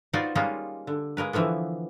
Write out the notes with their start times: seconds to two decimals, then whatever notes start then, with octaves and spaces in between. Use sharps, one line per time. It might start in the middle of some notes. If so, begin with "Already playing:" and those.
0.13 D#4 F4 F#4 B4 C5 D5
0.35 G3 G#3 A#3 C#4 D#4 F4
0.87 D3
1.17 G#3 A#3 A#4 B4
1.33 D3 E3 F3 A#3 B3